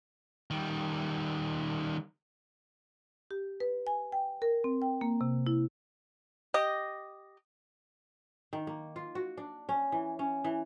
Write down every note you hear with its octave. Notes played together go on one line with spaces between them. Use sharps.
D#3 G3
G4
B4
G#5
G5
A#4
C4
G5
A#3
C3
E4
G4 D#5
D#3
A#3
F4
F#4
D4
C#4
E3
C#4
E3